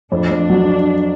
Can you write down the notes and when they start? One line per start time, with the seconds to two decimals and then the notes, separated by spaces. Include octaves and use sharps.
0.12 F2 D4
0.31 F2
0.50 F#3